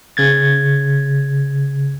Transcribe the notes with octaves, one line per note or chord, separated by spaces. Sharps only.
C#3 G#6 A6